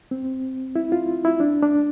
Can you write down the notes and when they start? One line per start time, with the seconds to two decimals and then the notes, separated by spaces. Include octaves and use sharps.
0.11 C4
0.76 E4
0.92 F4
1.25 E4
1.40 D4
1.62 D4